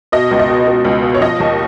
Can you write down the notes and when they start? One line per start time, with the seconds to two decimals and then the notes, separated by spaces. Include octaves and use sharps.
0.12 B2 D#5
0.31 C#2
0.39 D#5
0.50 B2
0.67 B2
0.85 C#2
1.03 B2
1.15 C#5
1.21 F3 D#5
1.40 D#2